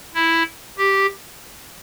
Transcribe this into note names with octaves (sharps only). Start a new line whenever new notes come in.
E4
G4